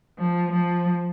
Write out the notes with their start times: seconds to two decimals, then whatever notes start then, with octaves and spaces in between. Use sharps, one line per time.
0.19 F3
0.52 F3